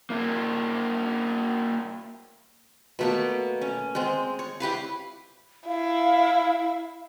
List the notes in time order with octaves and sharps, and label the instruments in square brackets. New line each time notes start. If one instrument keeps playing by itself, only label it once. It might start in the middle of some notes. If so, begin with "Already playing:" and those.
[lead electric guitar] A#3 E4
[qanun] B2 A3 A#3
C#4
G#3 C4
C#5
E4 G4 B4 F5
[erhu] E4 [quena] F5